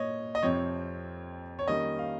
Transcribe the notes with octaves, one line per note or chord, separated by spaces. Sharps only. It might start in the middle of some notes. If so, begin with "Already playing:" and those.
Already playing: A#2 C#5 D#5
D#5
F2 C3 F3 C4 C#5
C#5
D#3 G3 A#3 C#4 D#5
F5